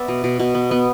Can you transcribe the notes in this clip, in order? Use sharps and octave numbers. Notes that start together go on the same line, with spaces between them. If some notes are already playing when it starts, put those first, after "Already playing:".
Already playing: B3 D5 E5
B2
B2
B2
B3
B3